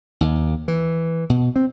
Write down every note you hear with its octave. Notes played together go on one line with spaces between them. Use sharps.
D#2
E3
B2
C4